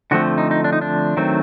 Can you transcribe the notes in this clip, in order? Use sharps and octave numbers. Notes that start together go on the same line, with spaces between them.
D3 F3 A3 C4 F#4
D#4
D#4
D4
D#4
D4
D#3 F#3 A3 C4